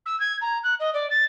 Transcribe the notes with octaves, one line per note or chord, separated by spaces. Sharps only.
E6
G#6
A#5
F#6
D#5
D5
A6